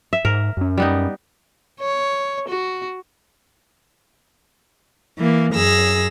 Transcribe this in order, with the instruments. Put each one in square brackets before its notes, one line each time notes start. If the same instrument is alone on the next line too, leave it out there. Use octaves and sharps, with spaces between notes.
[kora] E5
[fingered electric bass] G#2 [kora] A#4
[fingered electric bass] F#2 C#4
[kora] G3 B3 D#4
[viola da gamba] C#5
F#4
[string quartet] E3 A#3
F#2 G#4 E6 A#6